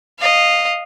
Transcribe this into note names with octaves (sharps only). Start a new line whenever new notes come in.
D#5 F5